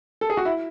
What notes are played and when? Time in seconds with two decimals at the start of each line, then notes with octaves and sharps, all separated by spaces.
0.21 A4
0.30 G#4
0.37 F#4
0.45 E4